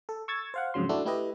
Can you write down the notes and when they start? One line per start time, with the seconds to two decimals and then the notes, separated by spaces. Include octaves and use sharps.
0.09 A4
0.28 C#6 E6 G#6 A6
0.54 C5 F5 F#5
0.74 F2 G#2 C#3 F#3 C6
0.89 A3 D4 E4 F#4 A4
1.05 A3 E4 G4 B4 D#5